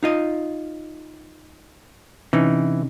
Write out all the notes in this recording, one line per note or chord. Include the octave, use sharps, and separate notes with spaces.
D#4 F4 D#5
C3 E3 C#4 D#4